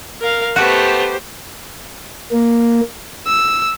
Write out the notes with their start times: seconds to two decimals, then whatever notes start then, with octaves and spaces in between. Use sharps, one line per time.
0.21 A#4 F5
0.56 A3 B3 F#4 G4 C5
2.32 A#3
3.27 E6